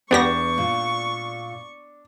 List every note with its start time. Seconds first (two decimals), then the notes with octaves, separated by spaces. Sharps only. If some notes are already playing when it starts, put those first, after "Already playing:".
0.11 E2 B3 D4 G4 C#6 A#6
0.58 A#2